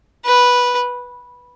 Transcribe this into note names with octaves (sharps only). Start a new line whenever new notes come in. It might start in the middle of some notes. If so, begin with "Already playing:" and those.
B4